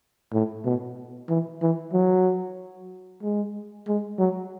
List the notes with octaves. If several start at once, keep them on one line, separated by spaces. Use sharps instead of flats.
A2
B2
E3
E3
F#3
G#3
G#3
F#3